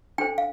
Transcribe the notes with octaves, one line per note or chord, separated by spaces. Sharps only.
D4 A4 C5 G5
F5